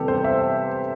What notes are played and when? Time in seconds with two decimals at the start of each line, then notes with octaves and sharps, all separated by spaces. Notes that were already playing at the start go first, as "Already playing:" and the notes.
Already playing: C3 E3 G3 B3 G4 A4
0.08 C5
0.24 E5